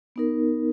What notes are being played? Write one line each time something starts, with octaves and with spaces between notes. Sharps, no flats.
B3 D#4 A#4